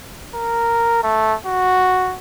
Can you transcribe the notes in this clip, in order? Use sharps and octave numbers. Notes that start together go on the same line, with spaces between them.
A#4
A3
F#4